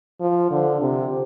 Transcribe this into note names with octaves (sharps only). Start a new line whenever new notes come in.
F3
D3
C3